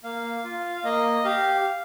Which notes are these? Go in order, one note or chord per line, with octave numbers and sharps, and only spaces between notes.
A#3 F5
F4
A#3 D#5
G4 F5